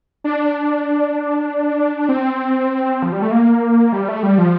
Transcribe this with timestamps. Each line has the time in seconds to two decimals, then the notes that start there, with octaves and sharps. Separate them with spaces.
0.24 D4
2.09 C4
3.02 F3
3.12 G3
3.22 A3
3.31 A#3
3.93 G3
4.08 A3
4.23 G3
4.38 F3